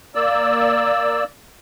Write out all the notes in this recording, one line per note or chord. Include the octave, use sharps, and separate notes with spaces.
A#3 D5 E6